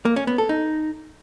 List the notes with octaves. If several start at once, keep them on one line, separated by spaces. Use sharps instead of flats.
A#3
C#4
B3
A4
D#4